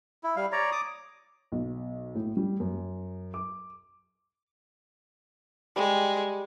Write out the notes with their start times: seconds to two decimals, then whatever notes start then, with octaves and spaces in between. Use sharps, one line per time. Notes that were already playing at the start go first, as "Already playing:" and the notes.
0.24 E4
0.36 G3 F5
0.52 C#5 D5 A#5
0.72 D6 D#6
1.52 B1
2.15 A2
2.37 G3
2.60 F#2
3.34 D6
5.76 G3 G#3